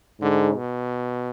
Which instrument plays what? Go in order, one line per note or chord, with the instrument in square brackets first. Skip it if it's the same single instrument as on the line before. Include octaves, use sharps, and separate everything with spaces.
[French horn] G#2 [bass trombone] D3
[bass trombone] B2